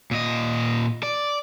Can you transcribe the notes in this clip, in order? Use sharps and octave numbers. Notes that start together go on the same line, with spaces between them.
A#2 D#5
D5